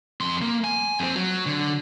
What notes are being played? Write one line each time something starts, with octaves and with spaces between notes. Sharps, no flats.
F2 C6
A#3
G#5
F2 C4
F#3
D3